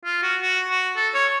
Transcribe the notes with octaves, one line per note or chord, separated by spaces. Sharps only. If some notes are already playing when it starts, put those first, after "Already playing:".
F4
F#4
F#4
F#4
A4
C#5